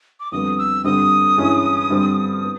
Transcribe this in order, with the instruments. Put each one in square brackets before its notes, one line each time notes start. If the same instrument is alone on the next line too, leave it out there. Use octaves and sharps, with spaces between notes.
[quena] D6
[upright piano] F2 D3 G3 B3 [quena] D#6
[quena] E6
[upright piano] G2 D3 G3 C4 [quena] D#6
[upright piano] G2 E3 G#3 C#4
G2 D3 G3 C4
B3